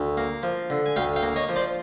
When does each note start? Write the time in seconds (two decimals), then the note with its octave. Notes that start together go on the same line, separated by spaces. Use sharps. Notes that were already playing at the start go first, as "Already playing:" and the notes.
Already playing: D2
0.17 A#3
0.43 F3
0.70 D3
0.86 G#5
0.96 D2 F5 G5
1.16 F5 G5
1.23 A#3
1.36 C#5 D#5
1.49 F3
1.56 C5 D5